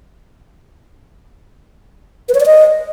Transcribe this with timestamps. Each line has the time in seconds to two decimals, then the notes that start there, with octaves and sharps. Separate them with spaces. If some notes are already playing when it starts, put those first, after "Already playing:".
2.29 B4
2.35 C#5
2.40 D5
2.46 D#5